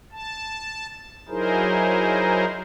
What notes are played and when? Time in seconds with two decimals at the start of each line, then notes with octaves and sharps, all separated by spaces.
0.12 A5
1.29 F#3 D#4 E4 G#4 A#4 C5